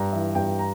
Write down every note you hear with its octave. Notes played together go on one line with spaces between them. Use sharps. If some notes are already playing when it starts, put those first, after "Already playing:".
Already playing: G2 A#5
E3 E5
G2 G5
A#5